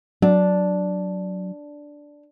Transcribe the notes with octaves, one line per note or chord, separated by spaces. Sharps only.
F#3 D4